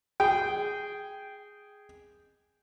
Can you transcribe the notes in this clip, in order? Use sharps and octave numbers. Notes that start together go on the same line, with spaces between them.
G#4 G5